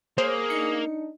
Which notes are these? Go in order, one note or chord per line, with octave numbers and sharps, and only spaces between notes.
A#3 G#4 C5 C#5
D4 D#4 C#7